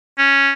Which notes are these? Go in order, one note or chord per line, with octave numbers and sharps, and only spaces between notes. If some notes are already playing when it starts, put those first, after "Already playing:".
C#4